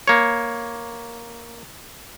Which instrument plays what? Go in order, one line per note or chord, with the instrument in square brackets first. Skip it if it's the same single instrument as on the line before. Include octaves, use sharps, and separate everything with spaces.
[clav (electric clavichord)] A#3 C#5